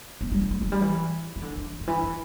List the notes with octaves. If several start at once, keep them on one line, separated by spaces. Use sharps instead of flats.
B3
G3
F#3
A3
F#3
G3
E3
E3
D3
E3
D3
E3
E3